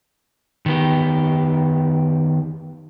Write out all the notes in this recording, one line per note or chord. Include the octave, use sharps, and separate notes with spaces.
D#3 B3 G4